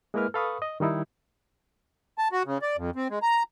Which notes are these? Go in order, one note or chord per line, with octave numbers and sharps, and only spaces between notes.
G#3 A#3 E4 A#4 B4 F6
A4 B4 F5 B5 C#6 D#6
D#5
D#3 G3 D#4 E4
A5
F#4
C#3
D5
F2
C4
G#3
A#5